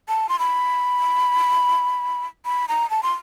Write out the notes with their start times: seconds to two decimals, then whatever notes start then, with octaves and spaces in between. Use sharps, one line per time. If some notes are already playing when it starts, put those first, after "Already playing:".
0.09 A5
0.29 C6
0.39 B5
2.45 B5
2.69 A#5
2.90 A5
3.03 C6